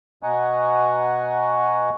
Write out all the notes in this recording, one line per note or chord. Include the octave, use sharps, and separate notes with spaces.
B2 D#5 F#5 G#5 A#5 C#6